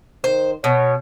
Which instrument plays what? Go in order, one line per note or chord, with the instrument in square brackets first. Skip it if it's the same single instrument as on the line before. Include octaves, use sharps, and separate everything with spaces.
[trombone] D#3 [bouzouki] C5
[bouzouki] B2 [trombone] C#5